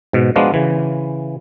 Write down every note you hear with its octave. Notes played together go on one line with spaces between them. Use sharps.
G#2 B2
F3 G#3 B3 D4 F4 F#4
C#3 E3